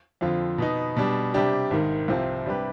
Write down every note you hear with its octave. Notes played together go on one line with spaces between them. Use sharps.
F2 D3 F3 C4 F4
B2 B3 D#4
B2 G3 D4
C3 G3 D4 G4
G#1 G#2 D#3
C2 C3 F3 C4 F4
C3 G3 D4 G4 B4